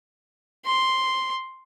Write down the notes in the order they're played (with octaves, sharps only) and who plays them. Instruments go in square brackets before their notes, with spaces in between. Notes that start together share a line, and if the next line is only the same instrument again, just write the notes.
[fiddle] C6